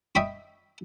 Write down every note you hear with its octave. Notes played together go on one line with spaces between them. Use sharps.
D#5 E5 G5 B5 C#6